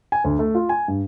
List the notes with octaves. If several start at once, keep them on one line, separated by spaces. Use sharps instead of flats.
G#5
D2
A3
F4
G#5
G2